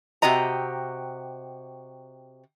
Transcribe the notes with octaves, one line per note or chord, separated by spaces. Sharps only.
C3 F#4 G4 D#5 A#5